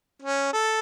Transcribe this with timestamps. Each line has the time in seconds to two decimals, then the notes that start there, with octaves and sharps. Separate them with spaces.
0.22 C#4
0.53 A4